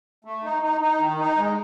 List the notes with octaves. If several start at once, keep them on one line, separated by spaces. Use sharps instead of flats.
A3
D#4
D#4
D#4
D#3
D#4
G#3